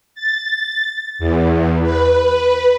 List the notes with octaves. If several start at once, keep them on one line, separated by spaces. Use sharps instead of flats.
A6
E2
B4